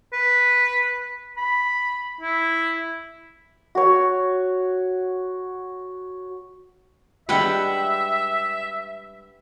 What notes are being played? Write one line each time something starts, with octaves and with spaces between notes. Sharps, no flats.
B4
B5
E4
F#4 C#5
G3 G#3 D4 B4 E5 F#5 G5